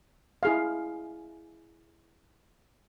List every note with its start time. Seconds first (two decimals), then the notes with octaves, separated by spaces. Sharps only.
0.43 E4 G#4 F5